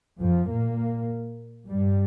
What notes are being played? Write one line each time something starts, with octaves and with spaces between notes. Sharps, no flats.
F2 F3
A#2 A#3
G2 G3